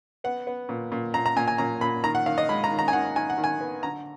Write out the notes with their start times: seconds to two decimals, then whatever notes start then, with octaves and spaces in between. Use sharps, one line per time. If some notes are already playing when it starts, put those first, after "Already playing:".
0.24 B3 F#5
0.47 B3
0.69 A#2
0.92 A#2
1.14 A#2 A#5
1.26 A#5
1.36 A#2 G#5
1.48 G#5
1.58 A#2 A#5
1.81 A#2 B5
2.03 D#3 A#5
2.15 F#5
2.26 D#3 F5
2.38 D#5
2.49 G#3 B5
2.64 A#5
2.71 D#3
2.79 A#5
2.88 G#5
2.93 D#3 F#5
3.16 D#3 G#5
3.30 F#5
3.38 D#3
3.44 G#5
3.61 B3
3.83 D3 A#5